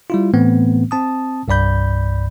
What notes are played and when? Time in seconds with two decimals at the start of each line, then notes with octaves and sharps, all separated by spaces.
0.10 G3 E4 F4
0.33 A2 E3 A3 B3 C4
0.91 C4 A5 D#6
1.48 C2 G2 D5 B5 G6